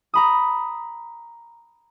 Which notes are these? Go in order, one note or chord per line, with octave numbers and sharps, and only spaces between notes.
A#5 B5 D#6